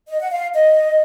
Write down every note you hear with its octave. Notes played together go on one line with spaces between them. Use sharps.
D#5
F#5
F5
D#5